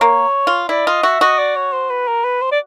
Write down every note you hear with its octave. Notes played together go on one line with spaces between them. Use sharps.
A#3 C#5
F4
E4 D5
F4 D#5
F#4 E5
F#4 D#5
D5
C#5
C5
B4
A#4
B4
C5
D5